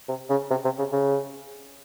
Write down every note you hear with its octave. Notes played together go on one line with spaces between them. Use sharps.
C3
C#3
C3
C3
C#3
C#3